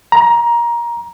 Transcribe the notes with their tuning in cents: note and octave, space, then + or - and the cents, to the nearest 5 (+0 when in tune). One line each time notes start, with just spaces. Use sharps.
A#5 +20